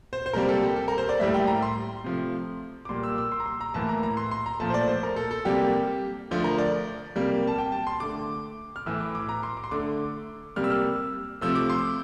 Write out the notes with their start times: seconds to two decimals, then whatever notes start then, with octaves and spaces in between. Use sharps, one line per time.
0.13 C5
0.26 C5
0.33 C3 G3 A#3 A#4
0.49 A4
0.63 G4
0.76 A4
0.88 A#4
0.98 C5
1.09 D5
1.19 A2 G3 A#3 E5
1.34 G5
1.47 A#5
1.62 C6
2.04 C3 F3 A3
2.85 D6
2.89 A#2 G3 A#3 C6
3.03 E6
3.18 E6
3.32 C6
3.40 A#5
3.46 C6
3.61 A#5
3.74 A2 E3 A#3 A5
3.89 A#5
4.03 A#5
4.17 C6
4.31 C6
4.46 A#5
4.60 A#2 F3 A3 A5
4.70 C5
4.74 D5
4.88 C5
5.03 A#4
5.16 A4
5.31 A4
5.45 C3 G3 A#3 G4
6.31 D3 F3 A3
6.44 A#4
6.58 D5
7.16 C3 G3 A#3
7.47 A5
7.58 G5
7.72 A5
7.87 C6
8.00 D3 A3 D6
8.76 F6
8.86 A2 E3 A3 E6
9.01 D6
9.15 D6
9.29 A#5
9.43 C6
9.57 D6
9.64 C6
9.71 D3 A3 D6
10.56 C3 G3 A#3 F6
10.64 E6
10.70 F6
11.41 C3 F3 A3 E6
11.55 D6
11.70 C6